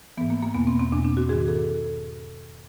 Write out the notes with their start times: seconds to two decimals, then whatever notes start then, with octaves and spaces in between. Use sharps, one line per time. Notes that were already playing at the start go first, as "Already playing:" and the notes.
0.17 G#2 E3 B3
0.30 A#3
0.43 A#3
0.55 E2 B2 B3
0.67 C4
0.80 C4
0.92 E2 B2 D4
1.05 D4
1.17 F#4
1.29 G#2 D#3 G#4
1.48 A4